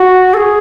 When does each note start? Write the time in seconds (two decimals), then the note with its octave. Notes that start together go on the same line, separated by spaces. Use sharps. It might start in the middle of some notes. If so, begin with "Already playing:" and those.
Already playing: F#4
0.34 A4
0.37 G#4